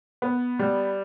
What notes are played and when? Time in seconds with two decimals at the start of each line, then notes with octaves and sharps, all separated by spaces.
0.22 B3
0.59 G3